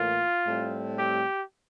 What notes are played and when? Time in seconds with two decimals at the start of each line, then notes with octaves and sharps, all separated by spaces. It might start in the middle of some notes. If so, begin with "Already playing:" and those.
Already playing: A2 E3 A#3 F4
0.47 A2 G3 C4
0.96 G4